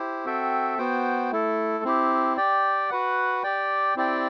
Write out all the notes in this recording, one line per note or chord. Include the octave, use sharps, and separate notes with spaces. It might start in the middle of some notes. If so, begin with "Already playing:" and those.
Already playing: E4 G4 C5
C4 F#4 A4 E5 G5
B3 F#4 C5 G5
A3 E4 A4
C4 E4 G4
G4 D5 G5
F#4 B4 F#5
G4 D5 G5
C4 E4 G4 D5 G5